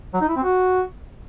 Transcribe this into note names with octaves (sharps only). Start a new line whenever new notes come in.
F#3
D#4
E4
C4
F#4